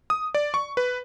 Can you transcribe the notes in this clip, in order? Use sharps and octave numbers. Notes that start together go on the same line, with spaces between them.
D#6
D5
C#6
B4